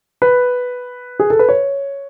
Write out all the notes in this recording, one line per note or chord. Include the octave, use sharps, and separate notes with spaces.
B4
G#4
A4
B4
C#5